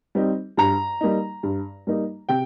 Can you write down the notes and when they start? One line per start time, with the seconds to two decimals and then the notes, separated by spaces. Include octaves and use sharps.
0.15 G3 C4 D#4
0.57 G2 A#5
1.01 G3 A#3 D#4
1.43 G2
1.87 G3 A#3 D#4
2.29 C3 G5